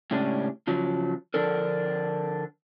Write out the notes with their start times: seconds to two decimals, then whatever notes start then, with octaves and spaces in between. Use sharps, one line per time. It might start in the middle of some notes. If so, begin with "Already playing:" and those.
0.11 A2 C#3 G#3 C#4 D4 G4
0.67 C#3 F3 F#3
1.34 D3 F3 D4 A4 A#4